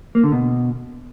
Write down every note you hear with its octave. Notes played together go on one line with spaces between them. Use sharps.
A#3
D3
B2